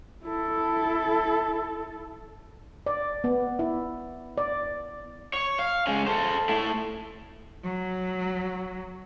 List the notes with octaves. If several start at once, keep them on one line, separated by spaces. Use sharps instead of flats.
E4 A4
D5
B3
E4
D5
C#5
F5
G#3 C#4
A4 C5
A3 E4
F#3